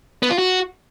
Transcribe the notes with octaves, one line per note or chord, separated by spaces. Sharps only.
B3
F4
F#4